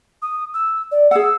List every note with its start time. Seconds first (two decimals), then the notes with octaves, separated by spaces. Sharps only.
0.22 D#6
0.54 E6
0.92 D5
1.11 G#4 F#5 E6